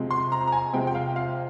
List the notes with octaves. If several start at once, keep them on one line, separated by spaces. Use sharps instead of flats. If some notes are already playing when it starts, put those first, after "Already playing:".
Already playing: C3 F3 G#3 C4
C6
A#5
A#5
G#5
C3 F3 G#3 C4 G5
G5
F5
F5